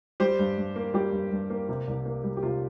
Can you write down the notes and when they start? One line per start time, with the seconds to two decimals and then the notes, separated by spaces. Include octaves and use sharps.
0.20 G3 G4 C5
0.39 G2
0.58 G2
0.76 A#3
0.94 G3 G4
1.12 G2
1.31 G2
1.50 A#3
1.69 C3
1.88 C2
2.05 A#3
2.24 G3
2.37 G4
2.43 C3 F4